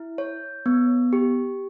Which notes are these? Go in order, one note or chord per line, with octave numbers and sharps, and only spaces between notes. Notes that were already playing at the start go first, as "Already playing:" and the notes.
Already playing: E4
C#5
B3
G4